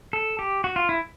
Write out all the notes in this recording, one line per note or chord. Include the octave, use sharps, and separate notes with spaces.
A4
G4
F#4
F4
E4